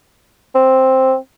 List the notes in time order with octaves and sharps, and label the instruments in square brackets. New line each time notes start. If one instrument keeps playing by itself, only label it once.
[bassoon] C4